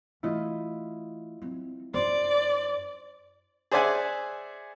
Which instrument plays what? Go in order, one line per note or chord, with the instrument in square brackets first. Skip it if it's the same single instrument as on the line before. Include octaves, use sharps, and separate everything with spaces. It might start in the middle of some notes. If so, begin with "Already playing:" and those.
[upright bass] E3 A3 [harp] E4 F4 D#5
[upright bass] F#3 C4
[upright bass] F#2 D4 [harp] C5 [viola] D5
[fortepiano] G#4 C5 D5 E5 F#5 G#5